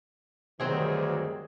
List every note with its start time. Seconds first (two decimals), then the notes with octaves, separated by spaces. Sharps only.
0.60 D2 G2 D#3 F#3 C4 G#4